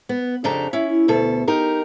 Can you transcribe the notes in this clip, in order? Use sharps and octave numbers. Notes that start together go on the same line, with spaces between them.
B3
F2 C#3 D4 G4 A4 A#5
C#4 E4
D2 B2 A4
D#4 G4 A#4